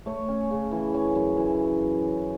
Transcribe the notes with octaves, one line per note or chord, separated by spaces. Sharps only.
A3 C#5
C#4
C#3
E3
C#4
F#2
E3 E5